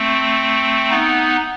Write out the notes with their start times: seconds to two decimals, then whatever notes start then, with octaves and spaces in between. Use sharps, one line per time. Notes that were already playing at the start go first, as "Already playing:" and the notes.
Already playing: A3 C4
0.90 B3 D#4